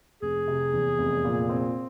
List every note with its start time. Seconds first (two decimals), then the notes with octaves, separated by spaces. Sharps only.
0.22 F1 G#4
0.48 C3
0.73 E2
0.99 F1
1.24 A#2
1.49 C4